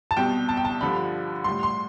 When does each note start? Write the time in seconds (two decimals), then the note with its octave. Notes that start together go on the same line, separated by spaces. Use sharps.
0.11 A5
0.17 C2 B2 G3 G5
0.49 A5
0.57 G5
0.65 A5
0.81 G2 D3 F3 B5
1.44 A2 G3 C6
1.63 C6